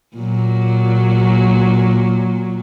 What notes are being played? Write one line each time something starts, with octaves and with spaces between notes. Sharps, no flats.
A#2 F#3